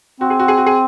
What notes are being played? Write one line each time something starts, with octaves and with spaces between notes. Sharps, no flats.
C4 F#4
G#4
F#4
G#4
F#4
G#4